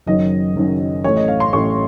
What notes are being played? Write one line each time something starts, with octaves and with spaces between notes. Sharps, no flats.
F#1 F#2 D#3 F#3 D#5
F#1 F#2 D#3 F#3
A1 A2 A3 C#5
D#5
F5
C6
A1 A2 A3 C#6